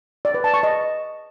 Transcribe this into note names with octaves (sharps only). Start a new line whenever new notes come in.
D5
B4
A5
C#6
D#5